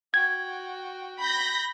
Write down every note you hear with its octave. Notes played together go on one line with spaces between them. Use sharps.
F#4 G5 G#6
B5 G6 A#6